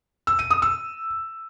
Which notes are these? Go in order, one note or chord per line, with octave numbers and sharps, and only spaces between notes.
E6
D#7
D#6
E6